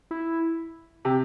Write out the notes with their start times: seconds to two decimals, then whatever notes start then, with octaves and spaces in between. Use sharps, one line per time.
0.11 E4
1.05 C3 G4